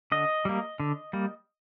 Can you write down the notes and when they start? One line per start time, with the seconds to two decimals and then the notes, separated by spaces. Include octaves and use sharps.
0.12 D3 D#5
0.45 G3 A#3
0.80 D3
1.13 G3 A#3